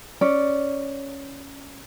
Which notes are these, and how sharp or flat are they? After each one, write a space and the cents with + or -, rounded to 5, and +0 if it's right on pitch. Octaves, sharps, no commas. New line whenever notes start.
C#4 +0 D5 +0